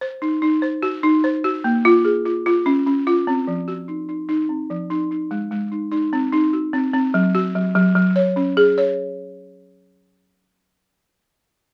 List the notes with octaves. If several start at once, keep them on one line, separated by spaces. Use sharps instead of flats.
C5
D#4
D#4
C5
F#4
D#4
C5
F#4
A#3
F4
G#4
F4
F4
C#4
C#4
F4
C4
F3
F#4
D#4
D#4
D#4
C4
F3
D#4
D#4
G#3
G#3
D#4
D#4
C4
D#4
F#4
C4
C4
F#3
F#4
F#3
F#3
F#3
C#5
C#4
G#4
C#5